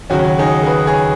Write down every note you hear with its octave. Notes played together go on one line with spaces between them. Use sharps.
D#2 C#3 F#3 C#4 F#4
D#4 G#4
G#4
F#4 B4
G#4 C#5